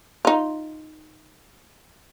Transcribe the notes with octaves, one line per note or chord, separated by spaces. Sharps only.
D#4 F4